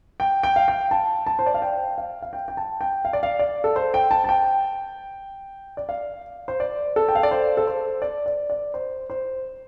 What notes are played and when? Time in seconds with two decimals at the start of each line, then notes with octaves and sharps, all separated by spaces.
0.20 G5
0.43 G5
0.56 F5
0.68 G5
0.91 A5
1.26 A5
1.39 C5
1.46 D5
1.54 F5
1.62 G5
1.98 F5
2.22 F5
2.33 G5
2.48 G5
2.57 A5
2.81 G5
3.05 F5
3.13 D5
3.23 F5
3.39 D5
3.64 A4
3.76 C5
3.94 G5
4.11 A5
4.24 A5
4.29 G5
5.77 D5
5.89 F5
6.48 C5
6.60 D5
6.96 A4
7.08 G5
7.15 F5
7.23 D5
7.31 C5
7.57 A4
7.67 C5
8.02 D5
8.26 D5
8.50 D5
8.74 C5
9.10 C5